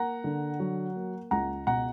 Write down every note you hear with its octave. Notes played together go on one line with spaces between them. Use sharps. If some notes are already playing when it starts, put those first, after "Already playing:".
Already playing: A#3 F#5 A#5
D3
F#3
A#3
C#2 F#5 A#5
B2 F#5 A#5